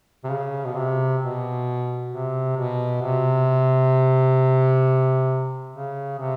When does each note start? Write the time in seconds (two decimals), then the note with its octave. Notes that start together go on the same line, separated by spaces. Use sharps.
0.24 C3
0.30 C#3
0.65 B2
0.75 C3
1.21 B2
2.11 C3
2.57 B2
3.02 C3
5.73 C#3
6.19 C3